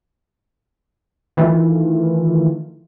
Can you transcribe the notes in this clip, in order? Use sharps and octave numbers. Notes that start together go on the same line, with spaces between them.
D#3 E3 A3 F4